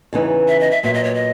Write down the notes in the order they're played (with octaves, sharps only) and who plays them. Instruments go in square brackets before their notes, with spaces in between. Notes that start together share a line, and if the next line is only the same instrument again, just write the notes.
[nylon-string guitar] E2 C#3 E3 B3 D#4
[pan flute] E5
D#5
E5
[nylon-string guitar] A#2 F#3 B3 [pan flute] E5
[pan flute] D#5
C#5
D#5